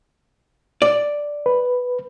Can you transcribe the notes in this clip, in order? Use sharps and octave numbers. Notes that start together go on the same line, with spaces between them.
D5
B4